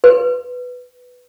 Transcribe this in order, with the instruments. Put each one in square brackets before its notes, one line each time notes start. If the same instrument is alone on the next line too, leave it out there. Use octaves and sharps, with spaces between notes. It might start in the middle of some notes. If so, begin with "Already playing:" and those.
[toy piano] B4